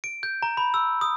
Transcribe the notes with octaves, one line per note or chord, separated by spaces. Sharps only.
D7
G6
A#5
B5
E6
D#6